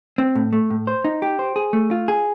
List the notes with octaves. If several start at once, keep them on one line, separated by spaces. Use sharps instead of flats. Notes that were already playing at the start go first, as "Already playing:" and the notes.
C4
A2
A3
A2
C5
D#4
G4
C5
G#4
A3
F4
G#4